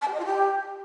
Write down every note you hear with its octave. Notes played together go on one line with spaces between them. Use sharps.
A5
G4
D#5
F4
G4